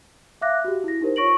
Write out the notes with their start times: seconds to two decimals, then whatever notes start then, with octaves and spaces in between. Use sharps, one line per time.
0.41 E5 F5 D6 F#6 A#6
0.64 F#4 G4
0.84 E4 A#6
1.01 D#4 G4 A#4 C5
1.16 F4 C#5 C#6 A#6 D7 F#7